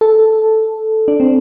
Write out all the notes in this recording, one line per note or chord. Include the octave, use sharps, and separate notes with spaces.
A4
D4
C4